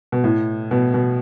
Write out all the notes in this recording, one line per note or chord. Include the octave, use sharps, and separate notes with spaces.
B2
A2
B2
B2